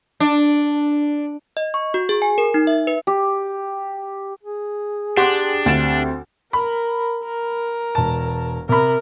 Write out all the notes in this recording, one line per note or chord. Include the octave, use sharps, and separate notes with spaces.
D4
D#5
C#6
F#4
G#4
G#5
A#4
D#4
E5
B4
G4
G#4
D4 G4 F#5 C6 D6
D2 C4 A6 E7
A#4 B5
A#4
E1 A5
C3 A#4 B5